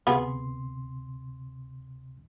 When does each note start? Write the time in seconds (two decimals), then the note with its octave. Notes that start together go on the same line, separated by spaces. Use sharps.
0.07 D2 C3 B3 G#4 C6